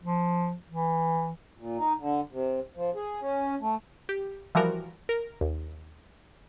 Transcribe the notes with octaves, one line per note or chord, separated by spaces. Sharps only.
F3
E3
A#2
D#4
D3
C3
F3
G#4
C#4
A3
G4
E3 F3 G3 F#4 A#4
A#4
D#2